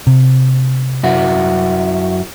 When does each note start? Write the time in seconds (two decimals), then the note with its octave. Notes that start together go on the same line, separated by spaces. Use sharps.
0.07 C3
1.03 F#2 E4 F#4